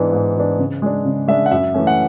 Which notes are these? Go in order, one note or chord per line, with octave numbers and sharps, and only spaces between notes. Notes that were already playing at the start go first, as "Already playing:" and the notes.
Already playing: G#2 E3 B3 D4
G#2
E3 B3 D4
C#3
G#3 D4
C#3
G#3 D4 E5
F#5
F#2 E5
E3 A3 C#4
F#5